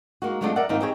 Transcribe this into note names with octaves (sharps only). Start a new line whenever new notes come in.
G#3 A#3 D#4 F#4
F#3 G#3 A3 C4 D4 F4
A#4 D5 E5 F#5
G#2 D#3 A#3 C4 D#4 F4
C4 D#4 G4 G#4 C#5